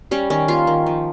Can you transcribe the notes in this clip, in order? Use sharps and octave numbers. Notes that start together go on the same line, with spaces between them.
G3 C#4
D#3 C#4
A#3 F4
D#3
F3